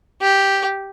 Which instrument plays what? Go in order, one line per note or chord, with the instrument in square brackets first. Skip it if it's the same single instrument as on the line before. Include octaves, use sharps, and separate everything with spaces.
[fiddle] G4